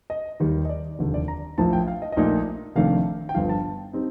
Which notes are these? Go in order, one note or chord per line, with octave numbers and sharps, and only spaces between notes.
D#5
D#2 D#3 G3
D#5
D5
F1 D#2 D3 G3
D5
A#5
A#1 A2 F3 A5
G5
F5
D#5
D#5
A#1 A#2 A3 D#4 D5
F1 F2 D#3 A3 D4 F5
G5
G1 G2 F3 F5
A5
G3 C4 D#4